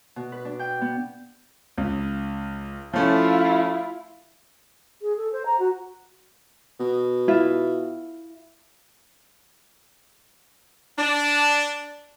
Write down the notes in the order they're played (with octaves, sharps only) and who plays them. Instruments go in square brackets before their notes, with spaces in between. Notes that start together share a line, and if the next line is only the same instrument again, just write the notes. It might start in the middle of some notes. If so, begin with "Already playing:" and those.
[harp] B2
B4
D4
G5
B3
[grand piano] C#2
[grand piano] F3 A3 C#4 [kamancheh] E4 F4
[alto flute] G#4
A4
C5
A#5
F#4
[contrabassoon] B2
[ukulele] E4 F4 E5
[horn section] D4